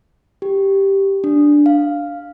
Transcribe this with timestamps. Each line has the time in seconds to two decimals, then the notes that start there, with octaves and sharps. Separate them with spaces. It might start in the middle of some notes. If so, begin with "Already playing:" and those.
0.42 G4
1.24 D4
1.66 F5